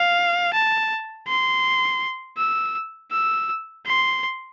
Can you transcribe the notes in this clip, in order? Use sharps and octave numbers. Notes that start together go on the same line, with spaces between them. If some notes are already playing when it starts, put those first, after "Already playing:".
Already playing: F5
A5
C6
E6
E6
C6